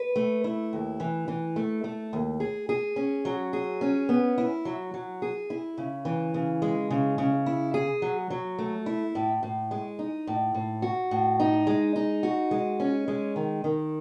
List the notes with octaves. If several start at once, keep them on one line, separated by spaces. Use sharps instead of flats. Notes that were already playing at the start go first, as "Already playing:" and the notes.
Already playing: B4
A3
E4
D#2
E3
E3
A3
A3
D#2
G#4
G#4
C#4
F#3
G#4
C#4
B3
E4
F#3
F#3
G#4
E4
C#3
E3
C#3
G#3
C#3
C#3
E4
G#4
F#3
F#3
A3
E4
A2
A2
G#3
D#4
A2
A2
F#4
A2
D#4
G#3
D#4
F#4
G#3
C#4
G#3
D#3
D#3